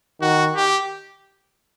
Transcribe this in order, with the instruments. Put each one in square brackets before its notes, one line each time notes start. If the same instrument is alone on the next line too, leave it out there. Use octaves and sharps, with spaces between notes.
[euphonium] D#3 [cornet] F#4
[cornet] G4